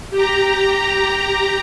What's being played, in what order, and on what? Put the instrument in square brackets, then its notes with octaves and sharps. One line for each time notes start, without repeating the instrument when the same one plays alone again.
[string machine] G4 A#5